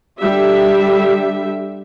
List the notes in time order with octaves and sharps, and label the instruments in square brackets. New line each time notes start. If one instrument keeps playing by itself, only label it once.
[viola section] D3 G3 G4 E5